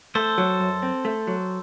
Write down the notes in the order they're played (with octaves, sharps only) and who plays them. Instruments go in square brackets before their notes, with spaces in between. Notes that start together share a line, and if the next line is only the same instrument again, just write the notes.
[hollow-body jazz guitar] A3 [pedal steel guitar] A4 C5
[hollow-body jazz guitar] F#3
F#2
C4
A3
F#3